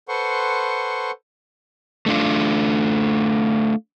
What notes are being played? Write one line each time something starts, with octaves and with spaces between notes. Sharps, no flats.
A4 B4 C5 F#5 C6 C#6
A3 D4 F4